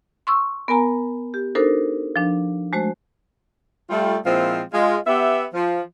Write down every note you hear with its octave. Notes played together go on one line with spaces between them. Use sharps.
C6 C#6 E6
B3 A#4 G#5 A#5
G4
D4 D#4 F#4 A4 A#4 C5
F3 D4
G#3 A3 F#4 C5
G3 A3 F4
A#2 F3 G#3 C4 E4 F5
G#3 F4
B3 G4 E5
F3